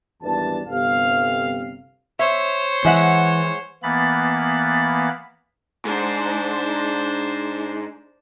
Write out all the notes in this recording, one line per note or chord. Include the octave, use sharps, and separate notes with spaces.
G#1 E2 E3 G3 D4 A5
G1 C3 F5
C5 C#5 E5
E3 G#3 E5 F#5
E3 A#3 B3 B5 A6
G#2 D4 C5